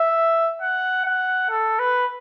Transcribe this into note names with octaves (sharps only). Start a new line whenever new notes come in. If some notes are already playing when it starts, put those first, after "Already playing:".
Already playing: E5
F#5
F#5
A4
B4